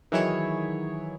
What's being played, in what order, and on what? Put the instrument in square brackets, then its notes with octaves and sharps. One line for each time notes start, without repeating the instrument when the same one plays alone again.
[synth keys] D#3 E3 F#3 E4 G#4 C#5